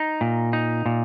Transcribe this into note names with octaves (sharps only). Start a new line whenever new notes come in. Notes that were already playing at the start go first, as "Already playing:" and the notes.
Already playing: D#4
A#2
D#4
A#2